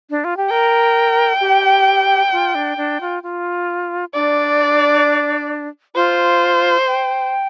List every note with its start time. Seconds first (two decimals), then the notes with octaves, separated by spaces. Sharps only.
0.10 D4
0.24 F4
0.37 G4
0.50 A#4 G5
1.40 G4
2.32 F4
2.55 D4
2.77 D4
3.01 F4
3.23 F4
4.14 D4 D5
5.95 F4 C5
6.87 G5